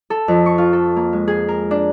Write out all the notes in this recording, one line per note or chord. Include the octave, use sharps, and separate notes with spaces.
A4
F2
C#6
F4
A4
A#3
G#3
G#4
A#4
D4